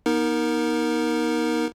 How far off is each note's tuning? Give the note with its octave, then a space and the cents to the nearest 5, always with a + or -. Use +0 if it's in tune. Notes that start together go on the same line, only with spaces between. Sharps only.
B3 -35 D#4 +15 A#4 +0